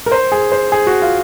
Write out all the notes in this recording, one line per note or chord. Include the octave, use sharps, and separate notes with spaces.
A#4
C5
G#4
C5
G#4
F#4
F4